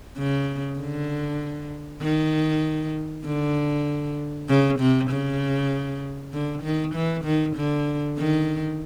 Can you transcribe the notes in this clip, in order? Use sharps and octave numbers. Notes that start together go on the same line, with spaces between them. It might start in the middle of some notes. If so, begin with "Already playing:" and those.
C#3
D3
D#3
D3
C#3
C3
C#3
D3
D#3
E3
D#3
D3
D#3